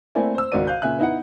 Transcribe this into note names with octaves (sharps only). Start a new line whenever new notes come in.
A3 A#3 C4 E4 D5 G#5
C5 E6
G#1 C#2 F#4 A#4 D5 D#7
F5 F#6 G6
A#2 C#3 E5 G#5 F#6
B3 D#4 E4 B4 F#5